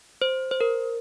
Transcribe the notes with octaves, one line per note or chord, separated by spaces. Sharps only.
C5
C5
A#4